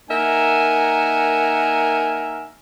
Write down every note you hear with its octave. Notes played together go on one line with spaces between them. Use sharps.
A#3 D#4 A#4 E5 F#5 G#5